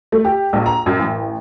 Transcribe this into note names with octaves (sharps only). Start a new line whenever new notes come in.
A3
G4
A#1
A#5
F#2
A1